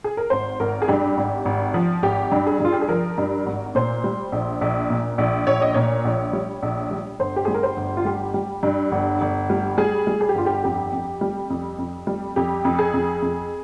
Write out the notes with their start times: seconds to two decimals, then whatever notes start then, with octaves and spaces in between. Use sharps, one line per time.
0.04 G#4
0.17 A#4
0.30 G#1 C5
0.60 G#1 A#4
0.82 G#4
0.88 G2 G4
1.17 G#1
1.45 G#1
1.74 F3
2.03 G#1 G4
2.32 G2
2.47 G#4
2.60 G2 F4
2.73 G4
2.82 G#4
2.89 F3 A#4
3.18 G2
3.46 G#1
3.75 A#2 C5
4.04 G3
4.32 A#1
4.61 A#1
4.90 A#2
5.18 A#1
5.47 A#1 C#5
5.62 D#5
5.74 A#2 C#5
6.05 A#1
6.33 G3
6.63 A#1
6.91 G3
7.19 G1 C5
7.36 G4
7.45 G3 G#4
7.54 A#4
7.63 C5
7.77 G1
7.97 F4
8.05 G3 G4
8.34 G3
8.63 G2
8.92 G1
9.21 G1
9.50 G3
9.78 G3 G#4
10.07 G3
10.21 G#4
10.29 G4
10.35 G1 F4
10.46 G4
10.64 F2 G4
10.93 F2
11.21 G3
11.50 F2
11.79 F2
12.07 G3
12.36 F2 G4
12.65 F2
12.79 G#4
12.94 F2
13.22 F2